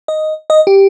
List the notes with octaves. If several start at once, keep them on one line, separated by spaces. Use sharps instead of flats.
D#5
D#5
G4